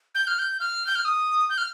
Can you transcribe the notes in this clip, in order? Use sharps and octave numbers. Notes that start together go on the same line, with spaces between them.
G6
F6
G6
F6
G6
F6
D#6
G6
F6